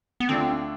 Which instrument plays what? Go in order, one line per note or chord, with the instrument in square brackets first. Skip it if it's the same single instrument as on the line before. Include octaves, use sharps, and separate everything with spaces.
[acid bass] B3
[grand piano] D2 D3 A3 D4 F4 [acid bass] C4